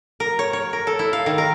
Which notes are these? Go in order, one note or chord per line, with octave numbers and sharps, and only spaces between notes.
A#4
C#5
C#5
A#4
A4
E4
F5
D#3
A#4